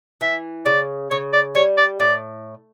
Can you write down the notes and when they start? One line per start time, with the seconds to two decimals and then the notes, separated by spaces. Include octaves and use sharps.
0.21 E3 E5
0.66 C#3 D5
1.11 C#3 C#5
1.33 D5
1.55 G3 C#5
1.78 D5
2.00 A2 D5